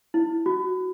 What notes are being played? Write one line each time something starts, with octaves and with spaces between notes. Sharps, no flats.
E4
F#4